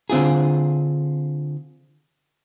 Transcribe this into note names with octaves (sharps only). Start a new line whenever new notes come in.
D3 C4 F4 G#4